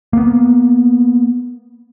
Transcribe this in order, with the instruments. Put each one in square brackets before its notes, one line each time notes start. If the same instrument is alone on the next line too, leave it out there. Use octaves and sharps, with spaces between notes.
[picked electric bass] A#3 B3